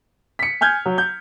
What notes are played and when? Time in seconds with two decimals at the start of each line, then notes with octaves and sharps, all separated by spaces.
0.39 B6 C#7
0.61 G#5 F6 G6 G#6
0.86 F#3
0.98 G6